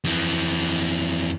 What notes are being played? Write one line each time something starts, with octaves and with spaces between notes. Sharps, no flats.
F2 E3